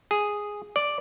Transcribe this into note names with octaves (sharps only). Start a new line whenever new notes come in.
G#4
D5